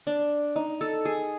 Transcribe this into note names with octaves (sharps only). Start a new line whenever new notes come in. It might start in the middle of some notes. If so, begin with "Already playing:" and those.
D4
D#4
A4
G#4